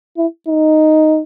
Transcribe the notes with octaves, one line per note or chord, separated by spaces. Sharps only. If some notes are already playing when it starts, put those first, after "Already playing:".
E4
D#4